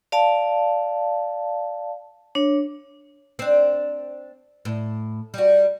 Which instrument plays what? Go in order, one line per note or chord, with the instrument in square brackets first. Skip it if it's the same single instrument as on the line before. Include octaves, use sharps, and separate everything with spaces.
[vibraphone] D5 F5 A5
D4 C#5
[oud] C4 D4
A2
G3 F#4